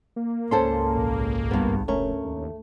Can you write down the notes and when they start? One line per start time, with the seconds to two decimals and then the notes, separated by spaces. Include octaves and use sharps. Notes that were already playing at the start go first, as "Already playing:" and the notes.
0.16 A#3
0.51 C#2 G#2 C#4 A4 C5 A5 C6
0.96 A#1
1.51 G2 B3
1.88 F1 A3 C#4 A#4 C#5
2.24 D#2